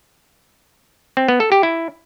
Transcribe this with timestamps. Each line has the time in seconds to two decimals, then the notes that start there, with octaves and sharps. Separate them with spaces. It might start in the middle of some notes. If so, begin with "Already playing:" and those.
1.17 C4
1.28 B3
1.40 A4
1.52 G4
1.63 E4